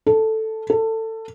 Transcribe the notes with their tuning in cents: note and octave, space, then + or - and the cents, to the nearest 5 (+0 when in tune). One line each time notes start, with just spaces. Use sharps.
A4 +0
A4 +20